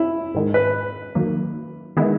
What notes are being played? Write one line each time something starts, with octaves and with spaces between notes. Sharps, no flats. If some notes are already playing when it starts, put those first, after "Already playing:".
Already playing: E4
G#2 D#3 G#3
B4
D#3 F#3 A#3
D#3 G#3 B3 E4